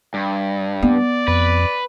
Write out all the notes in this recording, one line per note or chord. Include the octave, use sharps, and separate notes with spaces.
G2
B3 D5
F2 B4